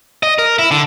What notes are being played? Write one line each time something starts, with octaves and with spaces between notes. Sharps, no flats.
D#5
A#4
E4
D3